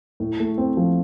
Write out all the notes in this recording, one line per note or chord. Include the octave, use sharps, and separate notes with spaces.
A2
A3
C4
F3